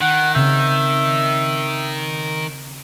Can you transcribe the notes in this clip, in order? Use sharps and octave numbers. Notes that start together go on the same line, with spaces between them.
D#3 F#5
C#3 C4 E5 G6